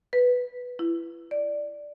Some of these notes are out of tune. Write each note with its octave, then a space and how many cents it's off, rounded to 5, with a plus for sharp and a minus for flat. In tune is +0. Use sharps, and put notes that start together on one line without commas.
B4 +0
E4 +30
D5 +0